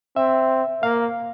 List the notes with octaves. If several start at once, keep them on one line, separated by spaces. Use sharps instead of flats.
C4 E5
A#3 F5